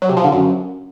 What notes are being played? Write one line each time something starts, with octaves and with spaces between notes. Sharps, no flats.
F#3
C3
F3
D3
F#2